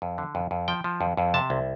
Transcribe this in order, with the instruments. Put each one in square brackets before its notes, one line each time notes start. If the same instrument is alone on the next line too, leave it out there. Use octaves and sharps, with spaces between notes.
[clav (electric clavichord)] F2
D3
F2
F2
F3 G5
F3
F2
F2
C3 A5
C2